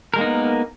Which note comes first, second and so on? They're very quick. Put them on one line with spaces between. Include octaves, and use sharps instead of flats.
A#4 G#3 A#3 D#4 B3